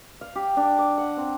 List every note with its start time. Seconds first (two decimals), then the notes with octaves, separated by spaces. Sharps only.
0.21 F5
0.35 G4
0.57 D4
0.79 D6
0.98 F#5
1.17 C4